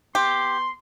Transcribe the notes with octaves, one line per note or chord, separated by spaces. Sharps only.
B3 G4 C6